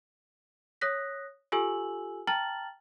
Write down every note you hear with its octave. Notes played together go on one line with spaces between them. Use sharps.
C#5 D#6 F#6 A#6 B6
F4 G4 A4 G#5 E6 F#7
G5 A5 A#5 F6 A6 F#7